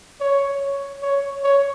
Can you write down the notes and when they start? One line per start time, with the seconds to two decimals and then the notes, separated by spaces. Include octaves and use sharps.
0.21 C#5
1.02 C#5
1.44 C#5